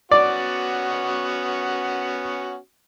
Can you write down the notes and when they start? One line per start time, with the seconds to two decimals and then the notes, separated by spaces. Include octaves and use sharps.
0.11 B3 C#4 F#4 D5